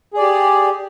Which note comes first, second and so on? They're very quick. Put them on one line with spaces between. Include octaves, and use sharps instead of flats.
G#4 D5 G4